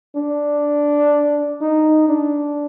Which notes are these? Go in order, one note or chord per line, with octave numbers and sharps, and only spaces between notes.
D4
D#4
D4